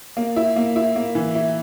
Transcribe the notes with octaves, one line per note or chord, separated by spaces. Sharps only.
A#3
E4
A#3
E4
A#3
E3
E4